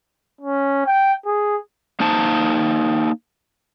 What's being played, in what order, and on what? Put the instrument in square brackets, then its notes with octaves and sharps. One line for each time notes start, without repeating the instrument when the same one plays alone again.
[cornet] C#4
G5
G#4
[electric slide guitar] A#3 D#4 C5 A5